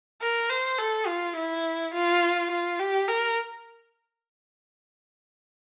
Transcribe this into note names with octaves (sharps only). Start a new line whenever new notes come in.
A#4
C5
A4
F4
E4
F4
F4
G4
A#4